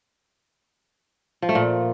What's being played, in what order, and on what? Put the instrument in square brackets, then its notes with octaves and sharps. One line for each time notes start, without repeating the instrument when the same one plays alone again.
[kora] F3
A3
A#2